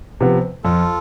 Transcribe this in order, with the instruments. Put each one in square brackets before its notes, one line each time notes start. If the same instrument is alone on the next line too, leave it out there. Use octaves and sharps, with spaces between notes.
[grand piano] C3 F3 B3
[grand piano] F2 [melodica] F4 A4